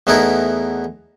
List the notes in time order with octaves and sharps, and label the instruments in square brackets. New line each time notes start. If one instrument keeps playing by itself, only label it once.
[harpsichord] E2 A3 B3 D#4 E4 A#4